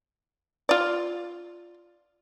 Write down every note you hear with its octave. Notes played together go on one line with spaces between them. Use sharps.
F4 D5